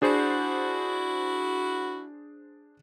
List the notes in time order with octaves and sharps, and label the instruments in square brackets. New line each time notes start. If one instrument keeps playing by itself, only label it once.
[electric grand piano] D4 G#4 C5 [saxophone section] E4 F#4